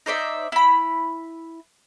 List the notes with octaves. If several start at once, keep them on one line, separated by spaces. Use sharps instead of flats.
D#4 C5 D5 E5
E4 B5